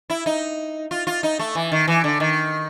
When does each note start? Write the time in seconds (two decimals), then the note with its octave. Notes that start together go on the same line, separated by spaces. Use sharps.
0.10 E4
0.26 D#4
0.91 F4
1.07 F4
1.23 D#4
1.39 A3
1.55 E3
1.72 D#3
1.87 E3
2.04 D3
2.20 D#3